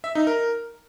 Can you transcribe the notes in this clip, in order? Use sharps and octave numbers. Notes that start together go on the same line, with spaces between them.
E5
D#4
A#4